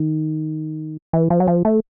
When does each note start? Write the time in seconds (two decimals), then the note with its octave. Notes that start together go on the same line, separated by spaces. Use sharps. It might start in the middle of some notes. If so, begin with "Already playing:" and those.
Already playing: D#3
1.13 E3
1.30 F3
1.40 F#3
1.48 F3
1.65 A3